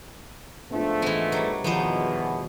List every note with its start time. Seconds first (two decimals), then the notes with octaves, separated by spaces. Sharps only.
0.71 G#2 F3 A3 B3 D4 F4
1.02 E3 G#3 B3
1.32 F#3 G3
1.64 E2 B2 D#3 F3 B3 D#4 F4 C5